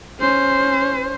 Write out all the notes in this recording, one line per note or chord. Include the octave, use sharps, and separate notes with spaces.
C#4 C5